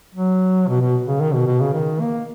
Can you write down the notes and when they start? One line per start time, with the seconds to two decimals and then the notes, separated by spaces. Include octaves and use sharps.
0.15 F#3
0.68 B2
0.81 B2
1.07 C#3
1.21 D#3
1.34 B2
1.47 B2
1.60 C#3
1.74 D#3
2.00 A#3